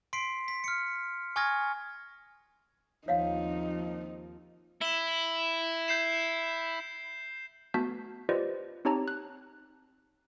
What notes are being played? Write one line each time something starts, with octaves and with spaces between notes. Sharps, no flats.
C6 B6 C7 D7
B6
F6 C#7
G#5 C#6 D#6 F6 G#6 A#6
D#2 F3 C4 D#4 C#5 F5 F#5
E4 E7 G7
G6 C7 E7
A3 B3 F#4 A5 G6 B6
F4 G4 B4 C5 D5 D#5
C4 D#4 G4 C#5 A5 A#5
F#6